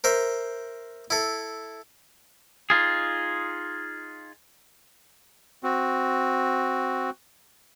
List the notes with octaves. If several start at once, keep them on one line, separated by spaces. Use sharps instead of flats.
A#4 C5 E5
E4 A4
D#4 F4 G#4
C4 F#4